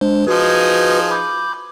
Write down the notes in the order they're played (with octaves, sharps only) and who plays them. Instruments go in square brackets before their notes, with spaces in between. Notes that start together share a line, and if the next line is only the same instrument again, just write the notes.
[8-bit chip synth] G#3 D4 C5
[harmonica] F3 D#4 G#4 [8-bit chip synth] F#4 B4
[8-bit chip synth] B5 D6 G6